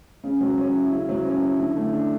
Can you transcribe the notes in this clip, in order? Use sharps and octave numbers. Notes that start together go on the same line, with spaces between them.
C#3
F#3
C#4
E4
C#3
F#3
C#4
E4
D3
A3
D4